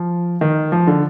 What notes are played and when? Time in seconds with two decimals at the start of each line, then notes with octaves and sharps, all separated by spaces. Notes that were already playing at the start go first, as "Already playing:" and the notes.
Already playing: F3
0.41 D#3
0.72 F3
0.87 D3